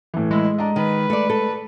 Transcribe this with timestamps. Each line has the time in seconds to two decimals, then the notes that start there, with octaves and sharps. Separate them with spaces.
0.14 A2 E3
0.31 G#3 E4
0.58 D4 D#5 A#5
0.76 D#3 B4
1.10 A3 A4 D5
1.30 A4